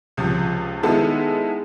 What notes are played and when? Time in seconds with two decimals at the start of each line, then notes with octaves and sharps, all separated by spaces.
0.17 C#2 C3 F3
0.83 D#3 G#3 B3 E4 A4